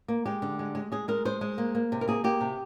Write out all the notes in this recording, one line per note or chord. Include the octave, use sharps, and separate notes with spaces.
A#3
G#3 G4
D3
G#3
G#3
G#3 G#4
G#3 A#4
G#3 C5
G#3
A#3
A#3
C3
A#4
A#3 G#4
A#3 G4
C3